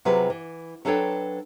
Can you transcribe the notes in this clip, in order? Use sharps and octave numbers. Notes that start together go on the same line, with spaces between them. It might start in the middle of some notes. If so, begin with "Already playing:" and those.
C3 F#3 F4 G4 G#4 B4
E3
F#3 D4 A4 B4 C#5 G5